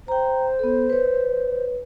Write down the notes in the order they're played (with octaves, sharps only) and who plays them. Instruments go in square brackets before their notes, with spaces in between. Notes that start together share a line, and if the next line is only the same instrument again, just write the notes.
[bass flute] C5 [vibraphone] G5 A#5
[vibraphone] B3 A4
B4 C#5